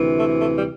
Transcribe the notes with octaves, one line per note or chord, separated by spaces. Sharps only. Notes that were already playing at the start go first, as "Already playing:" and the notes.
Already playing: D2 C3 E3
A3
A3
G3